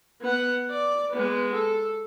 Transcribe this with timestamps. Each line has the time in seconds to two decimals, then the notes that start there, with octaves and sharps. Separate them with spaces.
0.21 B3 F#5
0.70 D5
1.11 G#3 B3
1.54 A4